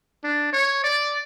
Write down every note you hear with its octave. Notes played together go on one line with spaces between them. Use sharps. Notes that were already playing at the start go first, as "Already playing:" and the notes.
D4
C#5
D5